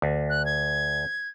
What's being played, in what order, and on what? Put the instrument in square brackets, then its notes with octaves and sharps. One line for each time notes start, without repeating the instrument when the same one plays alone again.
[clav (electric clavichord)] D2
[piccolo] F#6
G#6